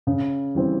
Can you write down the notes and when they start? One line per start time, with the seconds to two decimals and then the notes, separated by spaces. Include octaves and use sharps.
0.07 C#3
0.55 E3 G3 C4